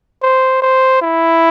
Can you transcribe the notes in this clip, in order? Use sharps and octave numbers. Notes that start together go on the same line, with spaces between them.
C5
C5
E4